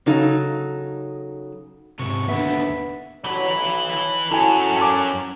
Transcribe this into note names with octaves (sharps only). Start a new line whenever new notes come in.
C#3 F#3 D#4 A4
G#2 C3 C#6
D#2 D3 B3 E5
A1 D3 E3 F#3 B4
B1
F#2 C#4 E4 F#4 A4 G#5
G#5 D6